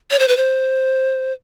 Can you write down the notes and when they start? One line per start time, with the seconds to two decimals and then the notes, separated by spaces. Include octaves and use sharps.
0.11 C#5
0.19 C5
0.28 B4
0.37 C5